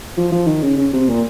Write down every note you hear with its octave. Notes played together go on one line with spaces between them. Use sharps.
F3
F3
D#3
C#3
C#3
C3
A#2